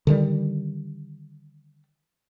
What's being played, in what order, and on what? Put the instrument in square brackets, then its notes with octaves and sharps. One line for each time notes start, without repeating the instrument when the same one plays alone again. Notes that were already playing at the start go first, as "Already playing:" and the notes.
[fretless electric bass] D3 D#3 G3